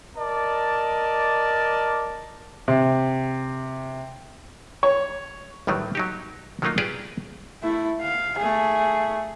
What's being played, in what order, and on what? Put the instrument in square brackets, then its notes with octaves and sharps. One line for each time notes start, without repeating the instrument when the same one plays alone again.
[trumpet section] A#4 D5 D#5 A5
[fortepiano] C3
C#5
[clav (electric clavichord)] A1 A2 D#3 F#3 G3
F#3 D#4 G4
D#3 F#3 A3 A#3 D#4 F4
F4 G4 G#4 B4 D5
[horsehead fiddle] A3 E4
F5
A3 G#4